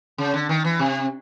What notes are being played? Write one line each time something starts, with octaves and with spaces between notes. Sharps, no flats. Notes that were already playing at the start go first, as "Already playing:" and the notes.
C#3
D3
D#3
E3
C3